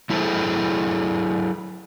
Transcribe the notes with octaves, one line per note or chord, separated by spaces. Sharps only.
F#3 E4 G#4 A4 C5